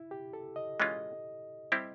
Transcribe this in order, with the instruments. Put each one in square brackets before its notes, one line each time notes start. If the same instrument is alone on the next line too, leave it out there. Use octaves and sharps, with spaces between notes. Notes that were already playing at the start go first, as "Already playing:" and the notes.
Already playing: [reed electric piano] E4
G4
A4
D#5
[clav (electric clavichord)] E3 G#3 C#4 F4 [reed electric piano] D#5
[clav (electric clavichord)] G3 C4 E4 G4